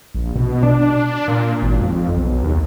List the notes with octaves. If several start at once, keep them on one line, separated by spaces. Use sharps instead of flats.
A#1
B2
D4
A#2
G#1
F2
B1
D#2